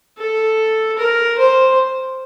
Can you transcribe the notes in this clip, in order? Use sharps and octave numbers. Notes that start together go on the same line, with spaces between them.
A4
A#4
C5